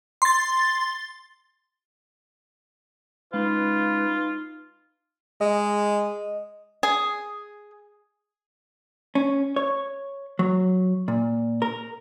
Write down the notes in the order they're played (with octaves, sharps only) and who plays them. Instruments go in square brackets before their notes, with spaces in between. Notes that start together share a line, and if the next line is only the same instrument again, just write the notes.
[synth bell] C6 A6
[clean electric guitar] G#3 C#4 F5 [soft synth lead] D#4 [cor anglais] F4 [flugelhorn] B4
[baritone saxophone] G#3 [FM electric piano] D#5
[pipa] G#4
[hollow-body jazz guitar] C#4
C#5
F#3
A#2
A#4